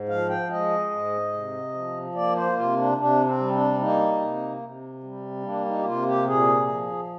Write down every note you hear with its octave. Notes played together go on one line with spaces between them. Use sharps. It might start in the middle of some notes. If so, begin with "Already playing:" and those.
Already playing: G#2
F3 F5
G5
G#3 D#5
G#2
C3
F3
A#3 D5
C5
C3 F4
D4
C3 D4
C4
G3
D4
A#3 D#4
C3
C3
G3
A#3 D4
D#4
G4
C3 F4
G4
A#2 G#4
F3